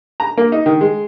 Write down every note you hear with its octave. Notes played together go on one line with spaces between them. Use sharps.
A#5
A#3
D#4
D#3
G#3